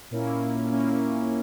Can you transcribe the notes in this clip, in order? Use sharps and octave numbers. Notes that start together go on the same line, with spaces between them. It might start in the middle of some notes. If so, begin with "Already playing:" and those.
A#2 A#3 C#4 E4
A#2 A#3 C#4 E4